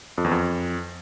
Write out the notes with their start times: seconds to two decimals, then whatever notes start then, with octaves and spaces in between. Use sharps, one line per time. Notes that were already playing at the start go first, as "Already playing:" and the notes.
0.18 F2
0.24 E2
0.31 F2